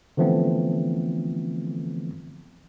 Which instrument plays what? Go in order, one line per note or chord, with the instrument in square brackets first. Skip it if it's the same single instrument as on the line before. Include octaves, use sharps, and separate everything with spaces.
[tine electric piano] D3 E3 F3 A3 B3 C4